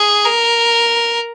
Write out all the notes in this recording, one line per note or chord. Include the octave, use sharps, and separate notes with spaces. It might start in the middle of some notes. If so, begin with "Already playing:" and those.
Already playing: G#4
A#4